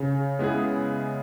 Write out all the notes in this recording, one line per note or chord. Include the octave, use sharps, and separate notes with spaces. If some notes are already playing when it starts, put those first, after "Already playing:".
Already playing: C#3
G#3 B3 E4 G#4